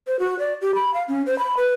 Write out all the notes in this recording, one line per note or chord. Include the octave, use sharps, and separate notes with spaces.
C5
F#4
D5
G4
B5
F5
C#4
C5
B5
B4